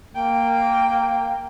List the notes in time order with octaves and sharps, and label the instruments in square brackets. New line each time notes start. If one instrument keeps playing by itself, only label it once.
[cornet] A#3 [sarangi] G5